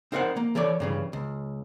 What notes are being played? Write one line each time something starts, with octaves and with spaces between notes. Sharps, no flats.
C4 D#4 A#4 C5 D#5 F#5
A#3
E3 A4 C#5 D5
G2 C#3 E3
C#2